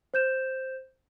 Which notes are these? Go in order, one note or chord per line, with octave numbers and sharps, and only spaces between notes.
C5 G6 E7